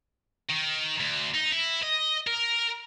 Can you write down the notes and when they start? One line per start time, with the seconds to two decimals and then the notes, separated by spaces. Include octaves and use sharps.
0.50 D#3
1.01 D2
1.35 D#4
1.52 E4
1.83 D#5
2.27 A#4